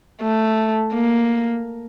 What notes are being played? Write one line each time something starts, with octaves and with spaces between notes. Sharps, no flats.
A3
A#3